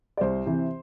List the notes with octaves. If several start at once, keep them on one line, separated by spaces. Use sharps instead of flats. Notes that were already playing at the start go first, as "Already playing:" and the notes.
D5
C2 C5
C3 E3